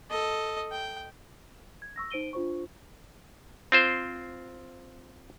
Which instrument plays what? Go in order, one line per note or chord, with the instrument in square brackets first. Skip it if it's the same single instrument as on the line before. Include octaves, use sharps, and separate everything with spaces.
[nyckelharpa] A4 D#5
G5
[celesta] G#6
C#6 E6 A#6
D#4 C5 D7 D#7 G7
D4 F4 C5 C#6
[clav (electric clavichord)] C4 F4 C5